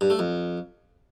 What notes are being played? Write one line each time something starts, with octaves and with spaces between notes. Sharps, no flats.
G2
A3
F2